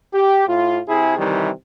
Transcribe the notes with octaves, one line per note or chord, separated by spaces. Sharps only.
G4
A2 F4
C3 E4 G#4
C3 D#3 E3 G3